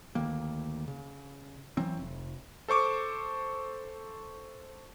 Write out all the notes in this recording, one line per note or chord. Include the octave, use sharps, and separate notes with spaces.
D2 D#3 A#3
C#3
E3 F#3 C4
F1
A4 C5 C#6 D6